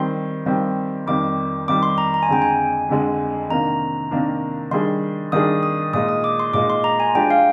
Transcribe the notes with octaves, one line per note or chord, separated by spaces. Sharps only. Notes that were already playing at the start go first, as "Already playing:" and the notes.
Already playing: D#3 G3 C4 G4 C6
D#3 G3 C4 G4
F2 D#3 G3 D6
F2 D#3 G3 D6
C6
A#5
A#5
G#5
F2 D3 G#3 G5
G#5
F2 D3 G#3
C3 D#3 A#3 D4 A#5
C3 D#3 A#3 D4
D#3 G3 D4 G#4 C6
D#3 G3 D4 G#4 D#6
D#6
A#2 G#3 D#4 D#6
D#6
D6
C6
A#2 G#3 D#4 D6
C6
A#5
G#5
F3 G#3 D4 G4 G5
F5